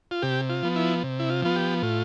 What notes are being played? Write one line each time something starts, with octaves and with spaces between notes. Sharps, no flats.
F4
C3 G4
F4
F3 B3
E4
C3
E4
F4
F3 B3 F4
G4
A2 F4